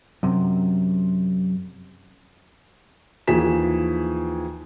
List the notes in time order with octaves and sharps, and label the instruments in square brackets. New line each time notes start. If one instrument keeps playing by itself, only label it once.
[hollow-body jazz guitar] F#2 C3
[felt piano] D#2 E3 F3 G#4 B6 E7